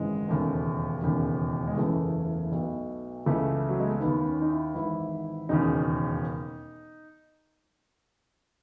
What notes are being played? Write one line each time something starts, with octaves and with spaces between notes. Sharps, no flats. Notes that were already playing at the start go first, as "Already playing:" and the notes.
Already playing: G#1 F#2 C#3 E3 G#3
E1 D#2 C#3 A3
E1 D#2 C#3
G#3
F#1 E2 C#3 E3 A3
B1 B2
C#2 C#3 E3 A3
F#3
G#3
A3
D#2 D#3 B3
C#4
D#4
E4
G#1 G#2 E3 E4
E1 D#2 C#3 D#4